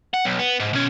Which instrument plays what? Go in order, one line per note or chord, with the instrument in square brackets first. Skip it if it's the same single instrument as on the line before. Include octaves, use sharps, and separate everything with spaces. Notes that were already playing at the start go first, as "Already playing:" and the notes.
[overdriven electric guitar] F#5
B1
B3
G#2
B2 C#4